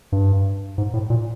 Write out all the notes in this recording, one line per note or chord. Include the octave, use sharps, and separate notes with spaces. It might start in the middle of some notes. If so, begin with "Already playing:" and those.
G2
G#2
A2
A#2